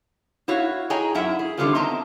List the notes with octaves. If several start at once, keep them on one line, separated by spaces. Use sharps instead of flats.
E4 F#4 C#5 F5
G#4 C#5 D#5 G5 G#5 A#5
F#2 E4 E5 F#5
G#4
D3 D#3 G3 B3 C#4 F4
B3 C4 D#5 E5 A5 A#5